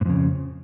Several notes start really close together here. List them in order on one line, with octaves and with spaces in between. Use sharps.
G#2 F2 C#3